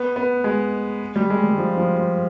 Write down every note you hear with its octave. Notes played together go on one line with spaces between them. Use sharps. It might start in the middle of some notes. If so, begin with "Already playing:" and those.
Already playing: B3
B3
G#3
G3
G#3
G3
F3
F3
F3